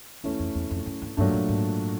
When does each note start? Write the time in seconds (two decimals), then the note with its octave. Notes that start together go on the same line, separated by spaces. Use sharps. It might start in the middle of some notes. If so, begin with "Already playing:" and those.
0.24 E2 E3 A3 C#4
0.39 F2
0.55 E2
0.71 F2
0.86 F#2
1.02 G2
1.17 G2 A#2 F#3 A3 D4
1.33 G2
1.49 G#2